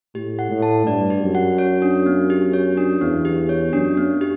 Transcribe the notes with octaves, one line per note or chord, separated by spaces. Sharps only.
A2 G4
F#5
A2
A5
G2 D5
G4
F#2
F#5
C#5
D4
B3
G4
C#5
D4
E2 B3
G4
C#5
F#2 D4
B3
G4